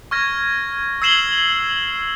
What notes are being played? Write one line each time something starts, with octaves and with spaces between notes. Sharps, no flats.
C#6 F6 G#6 A#6
E6 G#6 C7 E7 F#7 G7